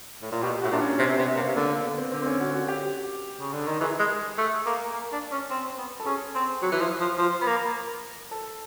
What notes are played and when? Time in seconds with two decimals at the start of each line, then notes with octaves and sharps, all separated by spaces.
0.22 A2
0.32 A#2
0.43 B2 G4
0.62 A2 F#4
0.72 A#2 D4
0.81 C#4
0.99 C3 C4
1.18 C3 B3
1.36 C3 A#3
1.56 D3 A#3
1.70 A#3
1.84 B3
1.98 C4
2.11 D3 C4
2.22 C4
2.27 C#4
2.41 F#4
2.54 F#4
2.68 G4
3.40 C#3
3.53 D3
3.67 D#3
3.81 E3 G#4
3.99 G#3
4.38 A3
4.66 A#3
4.94 A#3
5.13 D4
5.32 C#4
5.51 C4
5.78 B3
6.00 A4
6.06 C#4 G#4
6.35 C4
6.63 F#3
6.72 E3
6.81 F3
7.01 F3
7.18 F3
7.41 B3
7.48 A#3
8.31 A4